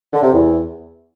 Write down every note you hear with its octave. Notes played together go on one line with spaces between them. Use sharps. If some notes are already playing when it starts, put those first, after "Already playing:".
D3
C3
E2